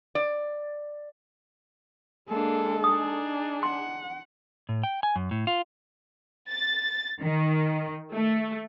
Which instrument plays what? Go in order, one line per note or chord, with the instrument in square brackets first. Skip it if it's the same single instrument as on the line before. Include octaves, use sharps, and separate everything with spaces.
[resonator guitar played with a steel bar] D5
[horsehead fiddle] G#3 A4 [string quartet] A#3 D4
[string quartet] D4 D#4 G#4 [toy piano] D#6
[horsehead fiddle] F#5 [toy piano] C6
[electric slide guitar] A2
G5
G#5
F#2
A2
F4
[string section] A6
D#3
A3